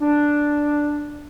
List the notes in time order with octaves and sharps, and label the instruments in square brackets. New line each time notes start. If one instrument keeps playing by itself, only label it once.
[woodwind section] D4